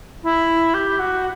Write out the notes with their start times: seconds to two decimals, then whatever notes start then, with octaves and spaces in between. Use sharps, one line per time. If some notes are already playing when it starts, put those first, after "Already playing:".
0.23 E4
0.74 G4
0.99 F#4